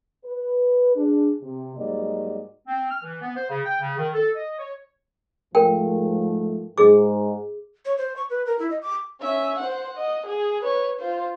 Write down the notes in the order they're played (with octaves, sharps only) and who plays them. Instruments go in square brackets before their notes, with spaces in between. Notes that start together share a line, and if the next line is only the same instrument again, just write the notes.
[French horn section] B4
D4 G#4
C3
G#2 F#3 G3 A#3 D5 D#5
[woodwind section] C4
F6
E3
B3
C5
C#3
G5
C#3
D#3
A4
D#5
C#5
[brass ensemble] G#2 F3 A3 [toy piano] A#4 G5
[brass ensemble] G#2 [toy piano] G#4 D6
[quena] C#5
C5
C#6
B4
A#4
E4
D#5
D6
[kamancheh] C#4 E5
C5 F#5
D#5 F#5
G#4
B4 C#5
F4 C5